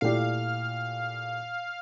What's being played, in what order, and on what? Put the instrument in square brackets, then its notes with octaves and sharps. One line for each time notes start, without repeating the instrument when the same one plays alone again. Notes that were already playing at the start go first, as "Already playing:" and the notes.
[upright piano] A#2 A3 E4 G4 D5 [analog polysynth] F5